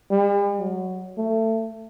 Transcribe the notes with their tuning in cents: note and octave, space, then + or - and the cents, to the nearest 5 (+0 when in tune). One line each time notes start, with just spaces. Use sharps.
G3 +45
F#3 +0
A3 +25